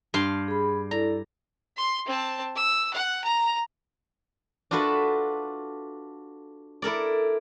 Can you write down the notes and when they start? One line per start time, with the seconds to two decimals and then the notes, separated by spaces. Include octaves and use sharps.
0.14 G2 F5 C6
0.48 G#4 B5
0.91 E4 A4 D5 A#5
1.77 C6
2.07 C4 A5
2.56 E6
2.93 F#5
3.24 A#5
4.71 D4 F4 F#4 A4 B4 E5
6.82 E4 A4 A#4 D5